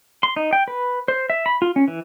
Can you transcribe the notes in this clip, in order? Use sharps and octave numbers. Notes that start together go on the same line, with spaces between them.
C6
D#4
G5
B4
C5
E5
B5
F4
C#4
E3